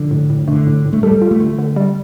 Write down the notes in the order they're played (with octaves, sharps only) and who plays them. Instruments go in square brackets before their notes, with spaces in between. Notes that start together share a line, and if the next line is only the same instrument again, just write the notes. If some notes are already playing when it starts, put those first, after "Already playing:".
Already playing: [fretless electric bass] D3 [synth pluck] F3
[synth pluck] A2
A2
[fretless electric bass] D3 [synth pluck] A3
[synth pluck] A2
A2
[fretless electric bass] A3
[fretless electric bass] G3 [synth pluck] A4
[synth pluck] F4
[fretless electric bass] A3
[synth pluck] D3
D3
G3